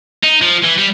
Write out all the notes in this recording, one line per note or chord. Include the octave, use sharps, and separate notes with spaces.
D#4
F3
E3
G3